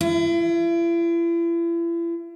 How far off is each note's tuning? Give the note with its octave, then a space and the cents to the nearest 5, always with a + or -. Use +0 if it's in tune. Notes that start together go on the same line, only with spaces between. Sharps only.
E4 +40